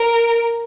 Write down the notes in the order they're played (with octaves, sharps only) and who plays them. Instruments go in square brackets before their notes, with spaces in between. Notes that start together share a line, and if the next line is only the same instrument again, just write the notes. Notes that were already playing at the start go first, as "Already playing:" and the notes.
Already playing: [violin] A#4